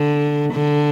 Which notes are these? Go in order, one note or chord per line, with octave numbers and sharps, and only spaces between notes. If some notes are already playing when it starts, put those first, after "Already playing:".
Already playing: D3
D3